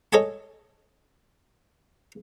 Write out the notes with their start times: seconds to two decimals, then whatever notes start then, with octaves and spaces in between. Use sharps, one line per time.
0.13 A4 C#5 D#5 G#5 A5